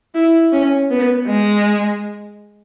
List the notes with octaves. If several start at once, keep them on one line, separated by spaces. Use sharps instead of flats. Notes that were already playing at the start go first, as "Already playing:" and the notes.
E4
C#4
B3
G#3